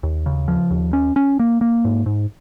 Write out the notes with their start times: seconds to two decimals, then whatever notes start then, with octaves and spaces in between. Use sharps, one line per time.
0.03 D#2
0.26 C#3
0.48 F3
0.71 D#2
0.93 C#4
1.16 C#4
1.39 A#3
1.61 A#3
1.85 G#2
2.06 G#2